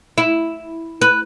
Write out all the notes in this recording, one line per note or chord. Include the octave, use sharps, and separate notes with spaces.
E4
B4